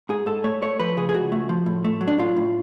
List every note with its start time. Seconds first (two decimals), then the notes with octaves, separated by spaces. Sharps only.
0.09 G#2 G#4
0.26 G#2 A4
0.44 A3 C#5
0.62 A3 C#5
0.79 F3 B4
0.97 C#3 G#4
1.09 G#4
1.14 C#2 F#4
1.32 A3
1.49 F3
1.66 A2
1.84 A3
2.01 F#3
2.08 D4
2.18 A2 F4
2.36 A2